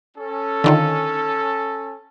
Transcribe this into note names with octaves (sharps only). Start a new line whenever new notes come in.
C#4 A4
D3 D#3 F4